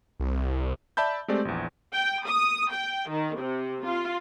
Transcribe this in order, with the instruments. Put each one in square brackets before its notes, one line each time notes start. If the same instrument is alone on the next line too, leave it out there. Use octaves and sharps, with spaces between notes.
[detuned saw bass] C2
[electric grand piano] D5 E5 A5 B5 G6
G#3 A3 C4 G4 D5
A#1 E2
[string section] G5
D#6
G5
D#3
C3
F4